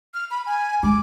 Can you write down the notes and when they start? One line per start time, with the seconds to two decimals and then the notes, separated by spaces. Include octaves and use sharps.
0.14 F6
0.31 B5
0.46 G#5
0.83 G#3 D6